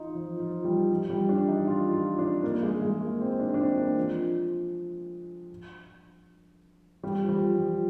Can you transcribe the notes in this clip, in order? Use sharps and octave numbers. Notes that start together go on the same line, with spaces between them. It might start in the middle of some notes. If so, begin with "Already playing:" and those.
Already playing: D#4 F4
F3
F3
G3
F3
G3
D4
D#4
F4
F4
D4
A#3
G#3
G#3
A#3
C4
D4
D4
C4
A#3
F3
G3
F3
G3
F3